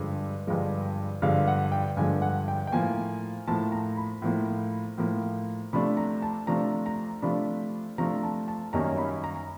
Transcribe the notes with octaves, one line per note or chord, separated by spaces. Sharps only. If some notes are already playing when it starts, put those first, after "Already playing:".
Already playing: G2 D3 F3 G#3
G2 D3 F3 G#3
G2 D3 F3 G#3 F5
F#5
G5
G2 D3 F3 G#3 G#5
F#5
G5
G5
A2 F3 A#3 G#5
A2 F3 A#3 A5
A#5
B5
A2 F3 A#3
A2 F3 A#3
C3 F3 A3 D4 B5
A#5
A5
C3 F3 A3 D4 A#5
A#5
C3 F3 A3 D4 B5
C3 F3 A3 D4 A#5
A5
A5
F#2 D#3 G3 A#3 C#4 A#5
B5
A#5